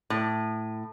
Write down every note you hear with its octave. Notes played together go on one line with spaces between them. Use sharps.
A2